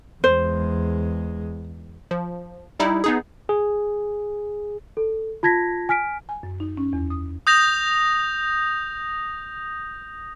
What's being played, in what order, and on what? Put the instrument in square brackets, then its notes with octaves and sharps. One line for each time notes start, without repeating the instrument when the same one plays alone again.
[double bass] E2 G#3 [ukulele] C5
[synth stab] F3
G3 D#4 E4
B3 D#4 G#4
[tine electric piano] G#4
[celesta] A4
F4 A5 G#6 A#6 B6
G#5 F6 B6 D7
[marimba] G#5
F#2
D#4
C#4
E2
D#6
[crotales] D#6 G6 A#6 F7